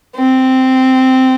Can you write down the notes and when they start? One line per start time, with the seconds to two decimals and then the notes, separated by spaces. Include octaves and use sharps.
0.16 C4